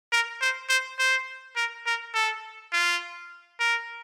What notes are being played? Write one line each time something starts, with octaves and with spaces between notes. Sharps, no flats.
A#4
C5
C5
C5
A#4
A#4
A4
F4
A#4